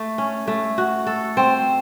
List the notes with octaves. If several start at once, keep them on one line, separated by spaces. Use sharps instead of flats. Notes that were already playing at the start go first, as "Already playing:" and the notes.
Already playing: A3
C#4
A3
F#4
A4
C4